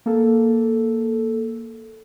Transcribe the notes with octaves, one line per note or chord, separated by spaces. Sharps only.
A#3 A4